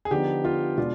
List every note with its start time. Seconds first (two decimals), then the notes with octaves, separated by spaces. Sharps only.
0.05 G#4
0.11 D3 F3 B3 D#4 G4
0.45 F4
0.78 B2 G#3 D4 F4